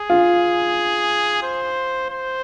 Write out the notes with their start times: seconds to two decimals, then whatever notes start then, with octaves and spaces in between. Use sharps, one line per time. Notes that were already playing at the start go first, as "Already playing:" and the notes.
Already playing: G#4
0.10 F4
1.43 C5
2.10 C5